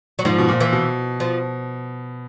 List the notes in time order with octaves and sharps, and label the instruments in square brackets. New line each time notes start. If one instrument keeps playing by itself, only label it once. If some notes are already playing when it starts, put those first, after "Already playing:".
[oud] F#3
[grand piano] G#2 [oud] F3
[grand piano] B2
A#2
[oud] E3
[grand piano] B2
[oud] F3